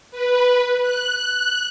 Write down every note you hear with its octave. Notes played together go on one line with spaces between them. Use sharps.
B4
F#6